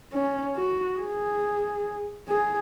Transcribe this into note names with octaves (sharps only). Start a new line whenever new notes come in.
C#4
F#4
G#4
G#4